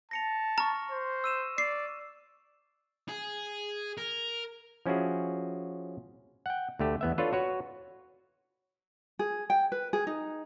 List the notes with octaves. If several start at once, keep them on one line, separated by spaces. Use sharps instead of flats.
A5 A#6 C#7 F7
A#5 C#6 F6
C5
E6 D#7 E7
D5 C7
G#4
A#4
F3 C#4 E4 F#4 G#4
F#5 G5
D2 A3 G4
E2 B3 E5
D4 F4 A4 B4 C#5
F#4 B4 C#5
G#4
G5
B4
G#4
D#4